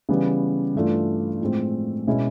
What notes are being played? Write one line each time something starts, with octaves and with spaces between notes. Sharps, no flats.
C#3 E3 G3 B3
G2 E3 A3 D4 F4
A2 F3 G#3 C4
B2 G#3 C#4 E4